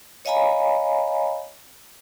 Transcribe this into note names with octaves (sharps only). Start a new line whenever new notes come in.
C#5 D#5 F5 G#5 A#5 B5